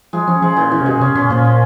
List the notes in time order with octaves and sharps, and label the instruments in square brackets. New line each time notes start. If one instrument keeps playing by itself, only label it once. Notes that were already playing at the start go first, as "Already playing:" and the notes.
[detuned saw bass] F3 [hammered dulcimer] G#3
[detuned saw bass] F3 [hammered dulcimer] C#4
[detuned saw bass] F3 [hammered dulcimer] G#3
[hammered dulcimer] A#2 [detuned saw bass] E3
[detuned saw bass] E3 [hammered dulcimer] C#4
[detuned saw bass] C3
[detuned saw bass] B2 [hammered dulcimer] G#3
[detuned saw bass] C3 [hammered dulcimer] C#4
[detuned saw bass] B2 [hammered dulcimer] C#4
[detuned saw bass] A#2 [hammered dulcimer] F3
[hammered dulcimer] F3